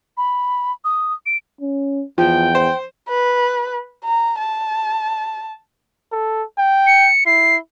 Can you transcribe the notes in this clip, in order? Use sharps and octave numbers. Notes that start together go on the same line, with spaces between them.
B5
D#6
D7
C#4
E2 F3 G5
C5
B4
A#5
A5
A4
G5
C#7
E4 C7